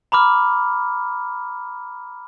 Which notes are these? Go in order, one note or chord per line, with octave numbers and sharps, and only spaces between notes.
A#5 B5 D6 F6